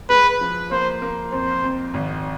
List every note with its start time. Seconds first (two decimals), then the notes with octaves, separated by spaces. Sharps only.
0.10 G#3 B4
0.41 F3
0.71 A#3 C5
1.02 A#3
1.32 F2 C5
1.64 F2
1.94 G#1